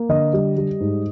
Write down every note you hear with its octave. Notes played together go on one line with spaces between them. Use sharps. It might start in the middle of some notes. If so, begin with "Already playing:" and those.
Already playing: A#3
D3 D#5
G3
G3
G#2